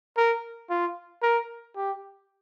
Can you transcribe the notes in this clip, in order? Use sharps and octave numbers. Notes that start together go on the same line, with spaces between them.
A#4
F4
A#4
G4